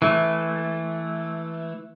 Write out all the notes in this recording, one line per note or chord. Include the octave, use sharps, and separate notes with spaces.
E3 A3